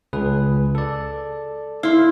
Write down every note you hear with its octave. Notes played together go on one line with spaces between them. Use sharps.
C#2 G#4 B4
A4 D5
E4 F5 C6